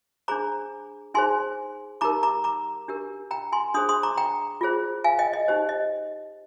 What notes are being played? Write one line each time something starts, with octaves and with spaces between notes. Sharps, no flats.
D4 G#4 C5 A#5 D6
D#4 G#4 C5 G#5 C6
D#4 G4 A#4 A#5 D6
A#5 D6
A#5 D6
D4 G4 A#4
G5 A#5
G#5 C6
D4 G#4 C5 C6 D#6
C6 D#6
A#5 D6
G5 A#5
F4 G#4 C5
F5 G#5
D#5 G5
D#5
D#4 G4 C5
D#5